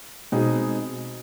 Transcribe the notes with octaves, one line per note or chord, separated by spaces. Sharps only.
B2 G#3 C4 D#4 G#4